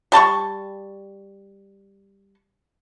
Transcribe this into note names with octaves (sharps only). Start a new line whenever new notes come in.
G3 A5 C6 C#6